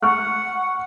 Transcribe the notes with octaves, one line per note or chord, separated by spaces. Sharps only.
F#5 C#6 F6 F#6